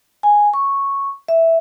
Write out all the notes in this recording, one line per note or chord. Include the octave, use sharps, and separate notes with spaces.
G#5
C#6
E5